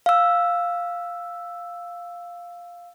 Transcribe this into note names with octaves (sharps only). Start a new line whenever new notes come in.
F5 E6